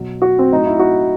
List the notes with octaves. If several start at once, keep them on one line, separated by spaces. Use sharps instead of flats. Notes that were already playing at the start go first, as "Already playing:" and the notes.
Already playing: B2 F#3
F#4
C4
A2 F#3 D#4
E4
F#4